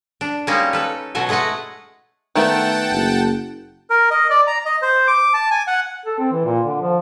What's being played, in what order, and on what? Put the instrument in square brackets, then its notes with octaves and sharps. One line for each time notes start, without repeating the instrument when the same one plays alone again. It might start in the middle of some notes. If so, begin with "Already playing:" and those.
[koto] D4
G3 G#3 A#3 C#4 D#4
A4 B4
B2 F#3 A4 G#5
G#3 A3 B4 D#5 F#5
[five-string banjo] D#3 A3 B3 [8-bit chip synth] F#5 G5 A5
[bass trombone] F#1
[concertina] A#4
D#5
D5
A#5
D#5
C5
D6
A5
G#5
F#5
[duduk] A4
C4
E3
A#2
D3
F3